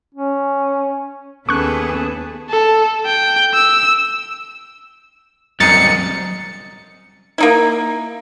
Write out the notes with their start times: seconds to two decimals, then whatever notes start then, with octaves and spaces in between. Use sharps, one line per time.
0.15 C#4
1.49 D#2 B3 C#4 G#4 A4 B4 C#6 F#6
2.50 A4
3.05 G5
3.54 E6
5.60 C2 F#2 D#4 G#4 A6 C#7
7.38 A#3 D#4 E4